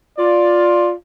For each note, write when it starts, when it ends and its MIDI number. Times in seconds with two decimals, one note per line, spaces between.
0.18 0.91 65
0.18 0.91 74